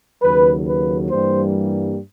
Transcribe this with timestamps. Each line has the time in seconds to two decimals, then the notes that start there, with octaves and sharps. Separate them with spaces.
0.22 D#2 C#3 F#3 B4
0.67 B4
1.10 G2 E3 G3 A#3 C5